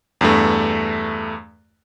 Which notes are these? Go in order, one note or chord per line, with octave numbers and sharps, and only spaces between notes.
E2 G2 A3